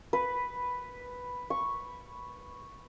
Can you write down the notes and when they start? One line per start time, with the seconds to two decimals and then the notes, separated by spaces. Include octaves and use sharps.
0.13 B4
1.50 C#6